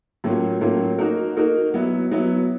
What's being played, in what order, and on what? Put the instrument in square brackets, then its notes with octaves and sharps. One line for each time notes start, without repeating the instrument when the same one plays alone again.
[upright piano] A2 F#3 A#3 C#4 F4
A2 F#3 A#3 C#4 F4
A#3 D#4 F#4 A#4
A#3 D#4 F#4 A#4
F#3 B3 E4
F#3 B3 E4